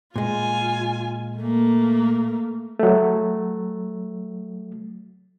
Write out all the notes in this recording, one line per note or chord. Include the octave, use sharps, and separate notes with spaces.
A#2 G#3 F4 G#5
A3 A#3
F#3 A3